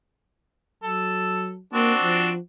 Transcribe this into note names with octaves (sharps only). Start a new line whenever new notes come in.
F#3 A4
A#3 C4 D4 F#4
F3